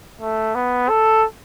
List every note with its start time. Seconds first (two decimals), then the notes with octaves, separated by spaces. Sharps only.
0.21 A3
0.55 B3
0.89 A4